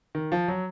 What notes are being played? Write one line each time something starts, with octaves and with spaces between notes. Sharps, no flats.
D#3
F3
F#3